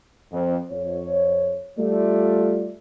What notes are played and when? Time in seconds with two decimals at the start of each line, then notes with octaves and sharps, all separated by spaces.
0.32 F2
0.72 F2 C#5
1.79 G3 A3 F4 D5